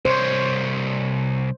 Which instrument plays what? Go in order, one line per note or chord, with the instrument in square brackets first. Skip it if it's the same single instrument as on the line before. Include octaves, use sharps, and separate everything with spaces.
[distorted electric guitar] C2 C#5 [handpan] C5